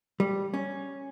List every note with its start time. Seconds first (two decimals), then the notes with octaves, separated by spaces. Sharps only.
0.20 G3
0.54 C#4